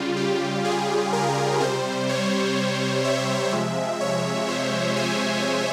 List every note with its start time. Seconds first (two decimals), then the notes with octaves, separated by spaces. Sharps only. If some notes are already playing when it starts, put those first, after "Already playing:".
Already playing: C#3 G3 F4
0.16 G4
0.64 G#4
1.13 A#4
1.60 C3 G3 C5
2.09 C#5
3.05 E5
3.52 C3 F3 G#3
4.01 C#5
4.48 C5
4.96 G#5